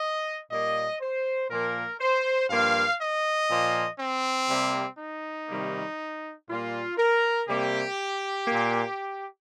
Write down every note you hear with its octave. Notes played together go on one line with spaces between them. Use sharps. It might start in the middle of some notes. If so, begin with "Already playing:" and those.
Already playing: D#5
A#2 G3 A#3 D#5
C5
A#2 F3 A#3 A#4
C5
G2 F3 A#3 F5
D#5
A#2 F3 A#3
C4
C3 G3 A#3
D#4
C3 D#3 G3 A#3
A#2 G3 A#3 F4
A#4
C3 G3 A#3 G4
A#2 A#3